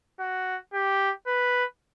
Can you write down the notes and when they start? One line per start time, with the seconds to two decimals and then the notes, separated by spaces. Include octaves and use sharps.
0.20 F#4
0.73 G4
1.27 B4